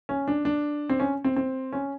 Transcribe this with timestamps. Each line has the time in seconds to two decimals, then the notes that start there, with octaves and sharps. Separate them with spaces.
0.09 C#4
0.28 D4
0.45 D4
0.89 C4
1.00 C#4
1.24 C4
1.36 C4
1.73 C#4